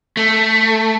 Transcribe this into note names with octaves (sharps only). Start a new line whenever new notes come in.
A3